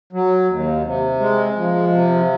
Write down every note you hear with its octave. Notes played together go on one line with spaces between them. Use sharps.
F#3
D#2
C3
G#3
F3
C3